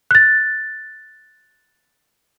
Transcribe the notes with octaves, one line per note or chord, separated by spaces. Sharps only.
F#6 A6